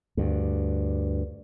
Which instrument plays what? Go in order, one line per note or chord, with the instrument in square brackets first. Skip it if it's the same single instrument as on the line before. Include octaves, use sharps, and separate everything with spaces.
[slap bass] D2 G2